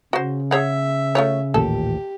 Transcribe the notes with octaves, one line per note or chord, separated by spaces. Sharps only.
C#3 F#4 C5
G#4 C#5 E5 F#5
A3 F4 C#5
A1 D#2 A#2 G4 A4